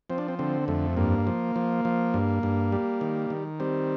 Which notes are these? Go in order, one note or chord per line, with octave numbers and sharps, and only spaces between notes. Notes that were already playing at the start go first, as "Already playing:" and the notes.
F3 C4
D4
C4
D3 C4
F2 A3
G2 A#3
F3
F3
F3
G2
G2
G3
D#3
D#3
G3 C4